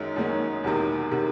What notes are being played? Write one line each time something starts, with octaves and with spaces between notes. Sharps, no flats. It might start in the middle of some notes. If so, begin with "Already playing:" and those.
Already playing: F#2 D#3 G#3 C#4
F#2 D#3 G#3 C#4
E1 E2 C3 D#3
C3 D#3